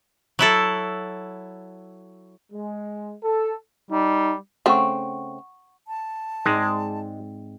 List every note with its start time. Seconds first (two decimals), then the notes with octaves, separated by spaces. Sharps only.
0.39 F#3 E4 A4
2.52 G#3
3.23 A4
3.91 G3 D#4
4.66 C#3 A3 C4 F#5 C#6
5.88 A5
6.46 G#2 G#3 C4 D5